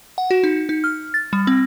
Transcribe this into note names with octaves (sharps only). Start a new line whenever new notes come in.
F#5
F#4
D#4
D#4
F6
A6
G3
C4